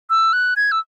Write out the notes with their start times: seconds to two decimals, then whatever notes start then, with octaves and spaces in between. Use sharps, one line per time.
0.10 E6
0.33 F#6
0.56 G#6
0.71 E6